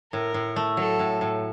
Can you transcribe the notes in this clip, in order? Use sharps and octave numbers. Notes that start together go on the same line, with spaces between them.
A2 A#4
A2
A3
F#3 A4
A2
A2